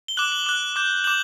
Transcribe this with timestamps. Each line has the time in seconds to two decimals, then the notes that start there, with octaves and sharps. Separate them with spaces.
0.08 G7
0.17 D6 F#6 F#7
0.32 F#7
0.46 D6 F#6
0.76 D6 G6
1.04 G6 F#7
1.07 D6